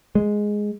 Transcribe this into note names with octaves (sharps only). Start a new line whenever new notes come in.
G#3